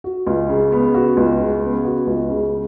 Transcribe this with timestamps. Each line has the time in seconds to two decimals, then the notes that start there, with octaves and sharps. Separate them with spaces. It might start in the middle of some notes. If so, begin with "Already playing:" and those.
0.04 F#4
0.27 C#2
0.49 C#3
0.72 B3
0.94 F#4
1.17 C#2
1.39 C#3
1.62 B3
1.85 F#4
2.07 C#2
2.30 C#3